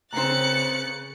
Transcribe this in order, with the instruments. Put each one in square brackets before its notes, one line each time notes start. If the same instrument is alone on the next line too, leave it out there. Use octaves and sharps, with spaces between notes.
[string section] C#3 C#7 [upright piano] C4 A#5 [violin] F#6 A6